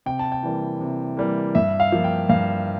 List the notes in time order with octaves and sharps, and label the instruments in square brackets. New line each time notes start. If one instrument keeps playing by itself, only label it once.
[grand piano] C3 G5
A5
G5
E3 G3 A#3
C3
E3 G3 A#3
G2 E5
F5
F3 A#3
G5
G2 F5